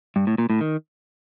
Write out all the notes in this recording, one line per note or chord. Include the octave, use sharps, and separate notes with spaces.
G2
A2
A#2
A2
D#3